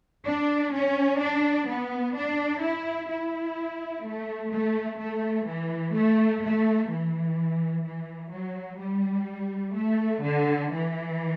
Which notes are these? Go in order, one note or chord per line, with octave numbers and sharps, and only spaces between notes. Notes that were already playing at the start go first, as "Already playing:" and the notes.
D4
C#4
D4
B3
D4
E4
E4
A3
A3
A3
E3
A3
A3
E3
E3
F#3
G3
A3
D3
E3